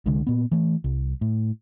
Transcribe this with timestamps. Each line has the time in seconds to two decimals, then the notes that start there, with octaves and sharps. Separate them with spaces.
0.06 C2 D3 G#3
0.27 A#2 B3
0.52 E3 A3
0.84 C2
1.21 A2